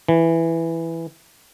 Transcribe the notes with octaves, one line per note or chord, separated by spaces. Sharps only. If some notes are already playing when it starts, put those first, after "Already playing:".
E3